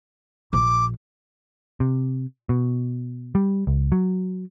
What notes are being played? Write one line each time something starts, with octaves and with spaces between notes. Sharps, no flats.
A#1 D6
C3
B2
G3
C#2
F#3